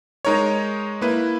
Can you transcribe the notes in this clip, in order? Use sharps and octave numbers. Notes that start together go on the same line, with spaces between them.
G#3 D#4 A#4 C#5
A#3 E4 B4